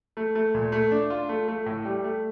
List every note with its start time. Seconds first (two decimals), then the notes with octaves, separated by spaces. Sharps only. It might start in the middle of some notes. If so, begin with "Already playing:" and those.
0.17 A3
0.35 A3
0.55 A#2
0.72 A3
0.91 D4
1.10 F4
1.29 A3
1.48 A3
1.66 A2
1.85 G3
2.04 A3